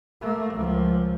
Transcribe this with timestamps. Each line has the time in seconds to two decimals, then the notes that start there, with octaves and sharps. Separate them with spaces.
0.21 A3 A#3
0.55 C#2 F3